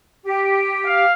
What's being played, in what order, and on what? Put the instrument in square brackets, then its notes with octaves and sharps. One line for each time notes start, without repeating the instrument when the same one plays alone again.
[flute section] G4
[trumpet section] F5